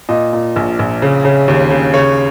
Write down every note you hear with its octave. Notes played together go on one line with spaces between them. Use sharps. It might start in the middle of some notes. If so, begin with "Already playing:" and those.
A#2 D#5
A#2
A#1
A#1
C#3
C#3
D#2
C#3
C#3 C#5